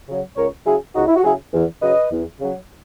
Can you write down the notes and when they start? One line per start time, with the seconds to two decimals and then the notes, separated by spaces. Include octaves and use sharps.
0.08 C#3 F#3
0.37 C#2 A#4 C#5
0.66 C#3 F#3 E4 G#4
0.95 C#2 D#4 F#4
1.07 E4
1.16 F#4
1.23 C#3 F#3 E4 G#4
1.53 E2
1.82 C#3 F#3 B4 D#5
2.12 E2
2.40 C#3 F#3